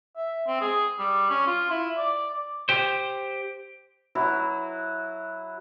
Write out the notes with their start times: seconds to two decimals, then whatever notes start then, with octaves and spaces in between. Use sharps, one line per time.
0.17 E5
0.47 C4
0.61 G#4
0.99 G3
1.30 C#4
1.47 F4
1.70 E4
1.97 D5
2.69 G4 C5
4.15 F#3 E4 F#4